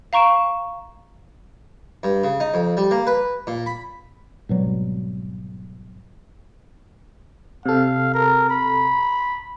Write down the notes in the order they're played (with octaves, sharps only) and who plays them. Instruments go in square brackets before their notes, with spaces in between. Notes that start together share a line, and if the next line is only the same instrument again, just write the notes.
[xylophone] F5 A#5 C#6 D7 E7
[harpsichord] G2
C#3
D#4
F2
G3
A#3
B4
A#2
B5
[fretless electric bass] G#1 B2 F#3 G3
[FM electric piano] C3 A4 [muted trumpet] F5
[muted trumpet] A#4
B5